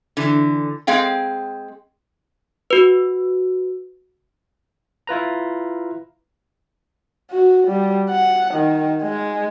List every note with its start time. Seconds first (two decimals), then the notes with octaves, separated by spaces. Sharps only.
0.17 D3 E3
0.87 G#3 C4 G#4 F5 G5
2.71 F#4 B4
5.07 E4 F4 B4 A#5
7.30 F#4
7.67 G3
8.10 F#5
8.54 D#3
9.03 G#3